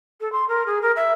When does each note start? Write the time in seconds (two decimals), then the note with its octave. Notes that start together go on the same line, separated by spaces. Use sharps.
0.21 A4
0.32 C6
0.48 A#4
0.66 G#4
0.82 A#4
0.96 E5